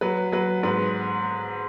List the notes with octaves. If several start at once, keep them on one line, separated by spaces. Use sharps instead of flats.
F#3 B4
F#3 B4
G#2 B4